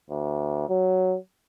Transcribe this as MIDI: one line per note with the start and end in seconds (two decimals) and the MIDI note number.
0.10 0.68 38
0.69 1.16 54